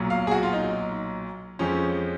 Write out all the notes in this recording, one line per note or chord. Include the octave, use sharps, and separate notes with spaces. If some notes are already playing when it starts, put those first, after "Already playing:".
Already playing: B1 A#2 F#3
F5
G#4
F#4
F4
D#4
F2 F3 G#3 C#4